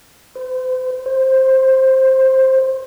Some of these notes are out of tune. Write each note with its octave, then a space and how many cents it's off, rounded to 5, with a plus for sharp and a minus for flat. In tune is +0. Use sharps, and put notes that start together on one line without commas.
C5 -40
C5 +10